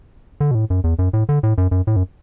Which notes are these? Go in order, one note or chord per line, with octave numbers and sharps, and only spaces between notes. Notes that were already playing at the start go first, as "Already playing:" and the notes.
D3
B2
A2
F#2
E2
F#2
A2
D3
A2
F#2
F#2
A2
F#2